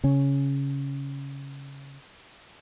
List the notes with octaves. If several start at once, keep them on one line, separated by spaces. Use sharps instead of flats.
C#3 C#4